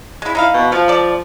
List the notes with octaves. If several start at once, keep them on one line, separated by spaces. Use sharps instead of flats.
G#3 E4
D#4 E4 F5
B2
F3 F5
A4 D5